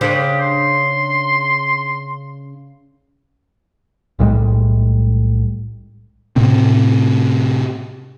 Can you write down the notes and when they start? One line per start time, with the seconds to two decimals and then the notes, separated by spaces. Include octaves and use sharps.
0.01 C#3 D4 G4 C5
0.41 C6
4.19 B1 A2 G3 G#3
6.36 A2 C3 C4